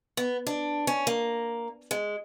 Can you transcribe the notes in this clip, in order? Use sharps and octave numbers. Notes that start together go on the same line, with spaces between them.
B3
D4
C#4
A#3
G#3